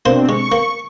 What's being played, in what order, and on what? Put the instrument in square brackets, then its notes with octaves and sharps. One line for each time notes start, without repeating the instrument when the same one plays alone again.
[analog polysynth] B2 C4 D4 [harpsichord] A#3 C5
[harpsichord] G#3 [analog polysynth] C#6
[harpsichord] A#3